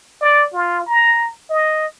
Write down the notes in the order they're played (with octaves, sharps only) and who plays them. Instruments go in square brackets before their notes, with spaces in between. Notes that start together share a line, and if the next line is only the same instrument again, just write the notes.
[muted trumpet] D5
F4
A#5
D#5